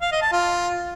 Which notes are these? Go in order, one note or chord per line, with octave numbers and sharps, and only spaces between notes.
F5
D#5
A5
F4